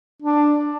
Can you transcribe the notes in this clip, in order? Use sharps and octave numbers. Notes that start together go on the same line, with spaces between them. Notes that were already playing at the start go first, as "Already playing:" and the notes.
D4